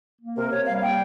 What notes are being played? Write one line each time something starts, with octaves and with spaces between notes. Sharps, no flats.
A#3
C3 A#4
C3 C#5
G3 F5
F5
A#3 G5